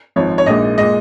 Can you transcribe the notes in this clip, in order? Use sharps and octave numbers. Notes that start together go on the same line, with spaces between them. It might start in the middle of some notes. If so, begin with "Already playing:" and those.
G#1 G#2 F3 C#5
C#5
A#1 A#2 G#3 D#4 D#5
A#2 G#3 D#5